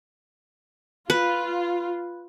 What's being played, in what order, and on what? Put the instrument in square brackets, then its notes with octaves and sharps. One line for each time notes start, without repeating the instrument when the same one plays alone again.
[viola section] F4 [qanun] B4